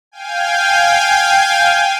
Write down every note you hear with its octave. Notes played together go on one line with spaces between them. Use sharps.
F5 G5 G#5